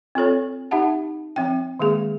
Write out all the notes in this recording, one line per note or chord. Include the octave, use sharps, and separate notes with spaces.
C4 F4 A4 C#5
D#4 G4 E5 F#5 A5
F3 C4 E5 G5
D#3 G#3 A#3 G#4